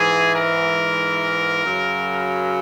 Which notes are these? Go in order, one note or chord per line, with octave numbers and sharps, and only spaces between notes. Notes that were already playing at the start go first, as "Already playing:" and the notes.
Already playing: G#2 E3 G#4
A#4
F#2 C#3 F#3